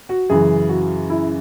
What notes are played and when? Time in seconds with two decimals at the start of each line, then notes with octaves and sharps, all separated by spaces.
0.09 F#4
0.30 F#2 C#3 E3 G#4
0.69 F#4
1.10 E4